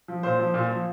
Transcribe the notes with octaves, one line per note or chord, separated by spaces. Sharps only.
F3
A#2 C5
F3
A#2
F3